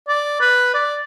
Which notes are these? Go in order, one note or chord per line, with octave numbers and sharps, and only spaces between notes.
D5
B4
D5